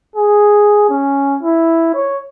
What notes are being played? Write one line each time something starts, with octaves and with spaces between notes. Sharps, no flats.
G#4
C#4
E4
C#5